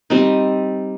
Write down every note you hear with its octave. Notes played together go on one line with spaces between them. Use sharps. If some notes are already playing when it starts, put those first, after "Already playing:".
G3 C4 D#4